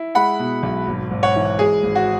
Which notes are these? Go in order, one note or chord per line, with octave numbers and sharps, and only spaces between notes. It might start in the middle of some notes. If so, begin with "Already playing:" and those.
Already playing: E4
G#3 F#5 B5
B2
B1
G#1
G#1
C#5 F#5
E3
G#3 G#4
G#1
F#4